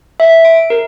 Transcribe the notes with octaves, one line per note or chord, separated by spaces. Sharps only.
E5
D7
A#4